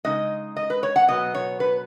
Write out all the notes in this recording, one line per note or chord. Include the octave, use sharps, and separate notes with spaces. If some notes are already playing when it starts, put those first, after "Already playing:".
C#3 G#3 D#4 D#5
D#5
B4
C#5
F#5
B2 F#3 B3 D#5
C#5
B4